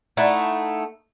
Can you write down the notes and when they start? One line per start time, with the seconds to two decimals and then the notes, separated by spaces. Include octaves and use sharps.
0.17 A3 D#4 E4 F#5 A5